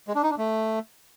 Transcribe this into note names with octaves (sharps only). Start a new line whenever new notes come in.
G#3
D4
D#4
D4
A3